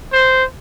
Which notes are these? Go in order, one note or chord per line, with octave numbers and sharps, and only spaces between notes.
C5